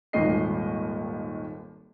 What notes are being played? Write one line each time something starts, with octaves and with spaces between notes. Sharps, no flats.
D#1 G#1 D#2 D#3 D#5 C7